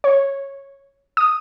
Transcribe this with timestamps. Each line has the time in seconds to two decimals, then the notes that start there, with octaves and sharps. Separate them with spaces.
0.04 C#5
1.17 D#6